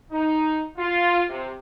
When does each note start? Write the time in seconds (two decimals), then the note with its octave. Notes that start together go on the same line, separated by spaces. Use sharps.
0.11 D#4
0.77 F4
1.28 C3